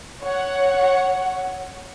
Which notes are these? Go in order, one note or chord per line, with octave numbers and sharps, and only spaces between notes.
C#5 F#5